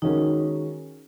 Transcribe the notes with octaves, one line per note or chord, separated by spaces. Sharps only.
D#3 G#3 C#4 D#4 F#4 A#4